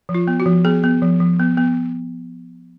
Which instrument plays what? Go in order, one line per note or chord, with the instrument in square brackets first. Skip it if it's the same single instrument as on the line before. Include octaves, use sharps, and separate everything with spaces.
[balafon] F3
F4
B3
F#4
F3
B3 G#4
B3
F3
F3
B3
B3